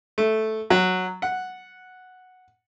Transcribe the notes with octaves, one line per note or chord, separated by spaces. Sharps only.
A3
F#3
F#5